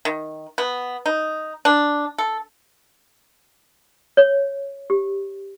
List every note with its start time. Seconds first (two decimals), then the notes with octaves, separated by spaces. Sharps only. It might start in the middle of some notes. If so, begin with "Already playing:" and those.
0.05 D#3
0.58 B3
1.06 D#4
1.65 D4
2.18 A4
4.17 C#5
4.90 G4